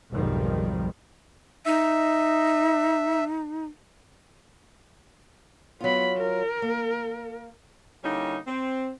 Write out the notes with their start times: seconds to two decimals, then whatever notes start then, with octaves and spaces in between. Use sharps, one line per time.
0.13 B1 F2 G#2 D#3 F3 G3
1.66 D#4 E5
5.81 F#3 B3 F4 B5
6.17 A#4
6.62 A#3
8.04 D3 G3 A#3 C#4 D#4 E4
8.47 C4